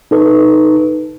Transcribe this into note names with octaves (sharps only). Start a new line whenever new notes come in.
D#4 A4 B4